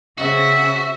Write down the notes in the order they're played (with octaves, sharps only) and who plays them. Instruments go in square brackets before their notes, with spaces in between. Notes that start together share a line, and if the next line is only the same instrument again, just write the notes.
[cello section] C#3 C4 [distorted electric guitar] F#4 [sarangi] E5